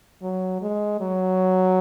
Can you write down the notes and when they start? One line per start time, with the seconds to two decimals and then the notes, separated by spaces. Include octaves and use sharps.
0.22 F#3
0.62 G#3
1.00 F#3